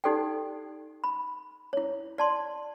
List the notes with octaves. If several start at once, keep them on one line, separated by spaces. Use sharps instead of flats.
D#4 G4 A4 D5 G5
B5
E4 C#5
D5 A5 C6